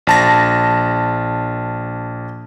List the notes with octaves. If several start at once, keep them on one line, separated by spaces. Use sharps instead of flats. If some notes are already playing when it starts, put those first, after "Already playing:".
A#1 A5 A#6